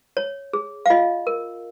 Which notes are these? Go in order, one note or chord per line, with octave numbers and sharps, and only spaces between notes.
C#5
G#4
F5
F4 D#5
A#4